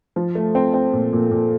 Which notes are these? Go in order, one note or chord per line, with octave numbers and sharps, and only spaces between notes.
F3
A3
C4
C4
A#2
A#2
A#2